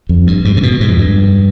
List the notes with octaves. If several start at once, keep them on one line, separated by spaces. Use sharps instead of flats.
F2
G2
G#2
C3
B2
G#2
F2
G2